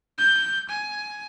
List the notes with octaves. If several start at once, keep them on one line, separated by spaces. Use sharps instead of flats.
G6
G#5